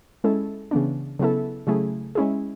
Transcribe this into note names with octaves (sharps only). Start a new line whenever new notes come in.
G#3 C#4 E4 A4
C#3 E3 B3 D4
C#3 F#3 B3 E4 A4
C#3 F#3 A3 E4 G#4
G#3 C#4 E4 G#4